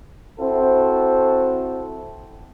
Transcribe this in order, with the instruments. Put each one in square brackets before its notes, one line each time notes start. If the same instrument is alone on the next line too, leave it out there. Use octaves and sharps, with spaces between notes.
[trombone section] C4 E4 F#4 A4 C5